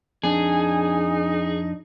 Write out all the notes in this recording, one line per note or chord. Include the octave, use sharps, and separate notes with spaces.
F2 D4 D#4 G#4